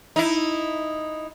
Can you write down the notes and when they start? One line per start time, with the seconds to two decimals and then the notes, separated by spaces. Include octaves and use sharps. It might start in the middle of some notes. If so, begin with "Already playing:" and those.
0.16 D#4 E4